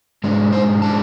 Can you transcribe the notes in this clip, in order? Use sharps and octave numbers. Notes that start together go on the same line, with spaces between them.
G#2 G#3 D4
C5
G#3 D4 A5